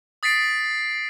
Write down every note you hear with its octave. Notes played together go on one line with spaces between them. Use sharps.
D#6 A6 B6 C7 D7